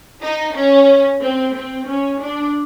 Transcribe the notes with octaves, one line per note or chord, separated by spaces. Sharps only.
D#4
C#4
C4
C4
C#4
D4